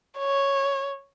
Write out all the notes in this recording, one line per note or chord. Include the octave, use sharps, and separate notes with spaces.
C#5